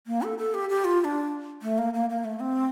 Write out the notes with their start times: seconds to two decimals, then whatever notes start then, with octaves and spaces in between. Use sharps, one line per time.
0.07 A#3
0.23 A4
0.38 A4
0.54 G4
0.69 G4
0.85 F4
1.01 F4
1.04 D4
1.62 A3
1.78 A#3
1.94 A#3
2.10 A#3
2.25 A3
2.40 C4